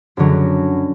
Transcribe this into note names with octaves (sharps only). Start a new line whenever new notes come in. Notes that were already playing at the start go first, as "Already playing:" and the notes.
F#2 D3 F#3